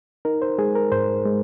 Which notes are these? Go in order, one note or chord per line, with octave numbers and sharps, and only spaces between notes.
D#4 A#4
C5
G#3 G#4
A#4
G#2 C5
G#3